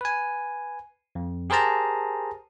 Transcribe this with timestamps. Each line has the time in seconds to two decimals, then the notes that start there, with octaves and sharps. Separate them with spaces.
0.01 B4 G#5
1.15 F2
1.50 G4 G#4 A#4 C5 A5 A#5